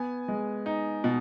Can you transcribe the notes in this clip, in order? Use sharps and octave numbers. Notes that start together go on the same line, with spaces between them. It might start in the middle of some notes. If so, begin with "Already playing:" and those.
Already playing: B3 G#5
G#3
D#4
B2